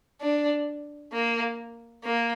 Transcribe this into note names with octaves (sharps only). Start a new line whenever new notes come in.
D4
A#3
A#3